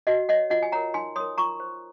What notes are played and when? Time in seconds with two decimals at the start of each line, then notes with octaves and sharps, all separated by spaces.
0.07 F#4 D#5 F#5
0.29 C#5 D#5 F#5
0.50 F4 D#5 F#5
0.63 G#5
0.72 A#4 C#5 F#5 A#5
0.94 D#4 G#5 C6
1.16 A#4 C#5 C6 D#6
1.38 F4 A#5 C#6
1.60 C5